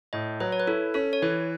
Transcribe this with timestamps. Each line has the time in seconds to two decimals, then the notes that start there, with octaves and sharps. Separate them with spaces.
0.13 A2 D#5
0.40 F#3 B4
0.52 C#5
0.60 B4
0.67 E4 A4
0.94 C#4 A4
1.13 C#5
1.22 E3 B4